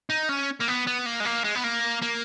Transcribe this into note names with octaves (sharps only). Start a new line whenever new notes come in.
D#4
C#4
A#3
B3
B3
A#3
G#3
A#3
G#3
B3
A#3
A#3